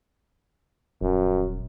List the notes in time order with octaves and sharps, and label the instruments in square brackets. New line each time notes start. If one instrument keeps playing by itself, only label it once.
[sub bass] D#1 [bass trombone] F#2